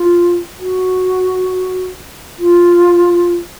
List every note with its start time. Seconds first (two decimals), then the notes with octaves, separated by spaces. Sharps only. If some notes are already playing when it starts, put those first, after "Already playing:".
Already playing: F4
0.59 F#4
2.39 F4